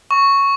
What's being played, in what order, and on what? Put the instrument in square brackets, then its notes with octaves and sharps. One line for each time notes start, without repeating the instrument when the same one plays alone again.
[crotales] C#6